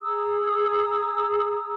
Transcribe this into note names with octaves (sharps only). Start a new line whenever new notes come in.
G#4 A#5 D#6 E6